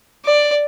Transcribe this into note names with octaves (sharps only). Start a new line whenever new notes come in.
D5